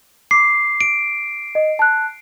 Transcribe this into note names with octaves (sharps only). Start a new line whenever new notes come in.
D6 C7
D7
D#5
A5 F#6